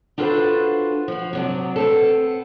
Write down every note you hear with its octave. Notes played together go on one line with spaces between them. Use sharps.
D4 F4 F#4 A4 B4 C5
F3 F#4
C3 F#3 D4
B3 C4 A4